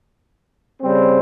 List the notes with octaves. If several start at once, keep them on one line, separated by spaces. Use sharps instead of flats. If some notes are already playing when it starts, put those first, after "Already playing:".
C#3 G3 C4